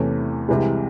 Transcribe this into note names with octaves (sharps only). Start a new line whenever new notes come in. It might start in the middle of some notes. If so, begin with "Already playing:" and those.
Already playing: E2 C3 E3 A3 C#4
C2 C3 E3 G#3